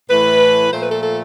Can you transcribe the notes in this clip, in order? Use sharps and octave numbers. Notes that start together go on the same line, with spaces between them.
A2 E3 A3 B4
A#2 F3 A3 C5
B4
A4
A4